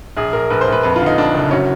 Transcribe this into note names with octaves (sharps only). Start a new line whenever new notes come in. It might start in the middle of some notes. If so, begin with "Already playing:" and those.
A#1 G#4
A#1 A#4
A#1 B4
C5
A#1
B4
F2 B4
F4
D3
D#4
F2 D4
F#1
F#3 C#4